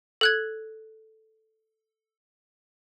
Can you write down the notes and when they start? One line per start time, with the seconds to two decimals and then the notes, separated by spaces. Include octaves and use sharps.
0.21 A4 F#6 G#6